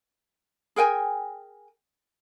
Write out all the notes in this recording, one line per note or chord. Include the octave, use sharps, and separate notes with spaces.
G#4 A#4 G5 G#5